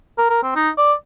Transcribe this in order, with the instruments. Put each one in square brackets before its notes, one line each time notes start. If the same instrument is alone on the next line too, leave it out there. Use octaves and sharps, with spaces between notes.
[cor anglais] A#4
A#4
C4
D#4
D5